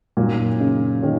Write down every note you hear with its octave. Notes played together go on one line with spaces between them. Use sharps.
F#2 A#2 D#3 F#3 C#4
C#3
D#3 F#3 C#4